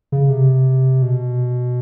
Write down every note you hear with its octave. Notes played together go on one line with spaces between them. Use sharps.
C#3
C3
B2